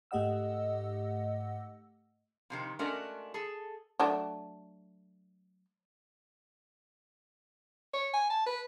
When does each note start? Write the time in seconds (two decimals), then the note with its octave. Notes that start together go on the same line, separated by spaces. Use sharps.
0.11 G#2 A3 G4 D#5 F#5 E6
2.50 F2 C3 D#3
2.79 G#3 A3 C#4 D4 F#4 A#4
3.34 G#4 A4
3.99 F#3 A3 D4
7.93 C#5
8.14 G#5
8.30 A5
8.46 B4